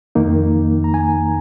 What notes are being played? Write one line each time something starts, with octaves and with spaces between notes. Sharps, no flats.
F2 D#3 A#3 D#4
A#5
G#5